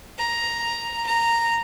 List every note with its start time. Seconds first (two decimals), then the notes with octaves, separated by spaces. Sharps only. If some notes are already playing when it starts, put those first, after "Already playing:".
0.18 A#5
1.06 A#5